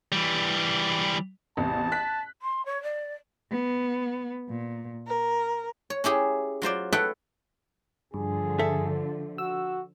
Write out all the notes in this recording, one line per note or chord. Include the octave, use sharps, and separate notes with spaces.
E3 G3
A1 E2 C3 A5
F#6 B6
C6
C#5
D5
B3
A#2
A#4
C#5
C#4 E4 G4 G#4
F#3 F4 C5 D5
A4 B4 C#5 E5 F#5 G5
G2 D3 F3 G#4
A4 E5
F#4 E6